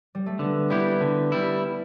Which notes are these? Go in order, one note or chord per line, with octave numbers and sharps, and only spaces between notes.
G3
A3
D3 B3
G3 B3 E4 G4
D3
G3 E4